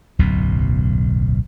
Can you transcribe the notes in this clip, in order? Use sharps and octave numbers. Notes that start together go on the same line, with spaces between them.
D1 B1 F#2 B2